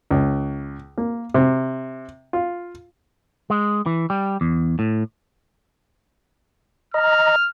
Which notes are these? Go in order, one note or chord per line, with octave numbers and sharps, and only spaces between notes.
C#2
A#3
C3
F4
G#3
E3
G3
E2
A2
D#5 A#5 F6